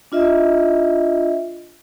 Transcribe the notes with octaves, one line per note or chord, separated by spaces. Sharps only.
D4 F4 D#5 E5